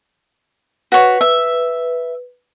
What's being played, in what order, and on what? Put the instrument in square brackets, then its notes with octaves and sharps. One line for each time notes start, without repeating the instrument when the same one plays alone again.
[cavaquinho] F#4 C#5 [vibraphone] B4
[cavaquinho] E5